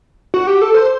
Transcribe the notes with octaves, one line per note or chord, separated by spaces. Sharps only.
F#4
G4
A4
C5